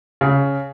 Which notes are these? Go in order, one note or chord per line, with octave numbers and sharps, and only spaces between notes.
C#3